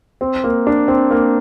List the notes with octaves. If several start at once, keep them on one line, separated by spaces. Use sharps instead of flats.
C4
A#3
D4
C4
A#3